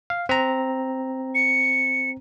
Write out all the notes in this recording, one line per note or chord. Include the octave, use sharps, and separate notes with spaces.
F5
C4 A#5
C#7